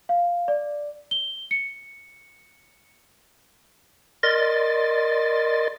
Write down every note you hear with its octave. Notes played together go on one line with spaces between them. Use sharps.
F5
D5
G7
C#7
A#4 D5 D#5 C6 A6